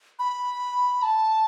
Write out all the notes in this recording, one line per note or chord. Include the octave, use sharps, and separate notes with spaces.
B5
A5